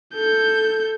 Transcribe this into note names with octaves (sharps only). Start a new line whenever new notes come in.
A4 G6